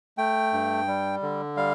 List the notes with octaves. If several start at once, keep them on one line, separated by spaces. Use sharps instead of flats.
A3 G5
G2
G3
D3
G3 F5